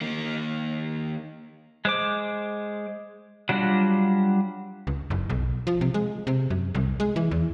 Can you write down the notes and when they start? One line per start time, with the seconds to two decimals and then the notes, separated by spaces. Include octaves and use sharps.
0.01 D#3 A#3
1.85 G#3 C5 D6
3.49 F#3 G3 D4 F4 F#4
4.87 C#2
5.10 F#1
5.30 B1
5.67 F3
5.81 C3
5.94 G#3
6.27 C3
6.50 F#2
6.75 C2
7.00 G#3
7.16 E3
7.31 E2